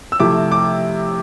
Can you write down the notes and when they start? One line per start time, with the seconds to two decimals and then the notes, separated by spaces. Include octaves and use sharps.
0.12 E6
0.19 C3 F3 A3 E4 D6
0.52 D6